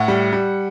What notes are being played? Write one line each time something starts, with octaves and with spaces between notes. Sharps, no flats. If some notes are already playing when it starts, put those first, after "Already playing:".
Already playing: A2 F#5
G3
G3